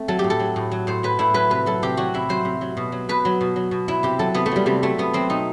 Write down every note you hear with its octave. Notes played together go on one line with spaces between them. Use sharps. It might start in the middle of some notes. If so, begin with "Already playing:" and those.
Already playing: A3 C4
F#3 A4
A2 G4
A4
F#3
A2
F#3
A2 C5
F#3 B4
A2 E4
F#3 B4
C3 B4
F#3 A4
C3 G4
F#3 F#4
C3 E4
F#3 C5
C3
F#3
B2
F#3
B2 B4
F#3
B2
F#3
B2
F#3 E4
C3 G4
F#3 A4
C3 B3
A3
F#3 G3
C3 G3
F#3 A3
C3 B3
F#3 C4
B2 D#4